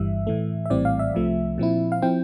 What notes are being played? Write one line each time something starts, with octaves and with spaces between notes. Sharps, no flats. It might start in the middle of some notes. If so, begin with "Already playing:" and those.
Already playing: G1 G2 E3 G3 E5
A2 E3 A3
E5
A#1 A2 E3 G3 C4 D5
F5
E5
C2 C3 F3 A3
A#2 F3 C4 E4
F5
F3 C4 E4 G5